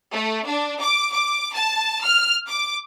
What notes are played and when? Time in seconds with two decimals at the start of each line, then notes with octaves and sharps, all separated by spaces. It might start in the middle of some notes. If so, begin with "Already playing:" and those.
0.12 A3
0.45 D4
0.80 D6
1.11 D6
1.53 A5
2.03 F6
2.48 D6